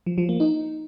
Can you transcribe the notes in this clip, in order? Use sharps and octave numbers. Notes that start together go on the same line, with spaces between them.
F3
F3
A#3
D#4